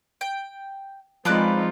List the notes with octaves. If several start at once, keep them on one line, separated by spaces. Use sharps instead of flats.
G5
F3 G#3 C4 D#4 F4 B4 D5 F#6